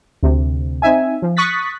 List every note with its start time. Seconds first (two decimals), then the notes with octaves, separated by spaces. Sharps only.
0.23 D2 C3
0.82 C4 D#4 E5 G#5
1.22 F3
1.37 C#6 D#6 F#6 A6 B6